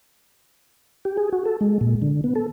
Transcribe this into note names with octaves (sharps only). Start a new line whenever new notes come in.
G4
G#4
F#4
A4
G#3
A#2
D3
B3
A4